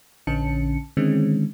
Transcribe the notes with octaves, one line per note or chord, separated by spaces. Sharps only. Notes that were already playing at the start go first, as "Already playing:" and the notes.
A#1 D3 C#4 A5 C#7
D3 D#3 G#3 C4 C#4